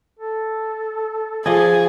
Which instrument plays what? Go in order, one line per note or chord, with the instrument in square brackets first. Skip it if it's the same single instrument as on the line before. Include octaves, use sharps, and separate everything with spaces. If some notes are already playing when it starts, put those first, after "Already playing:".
[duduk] A4
[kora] F3 D5 D#5 [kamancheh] G#4 [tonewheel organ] G#5